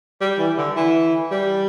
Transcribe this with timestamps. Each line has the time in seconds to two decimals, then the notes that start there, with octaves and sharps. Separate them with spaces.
0.21 G3
0.38 E3
0.58 D3
0.76 E3
1.31 G3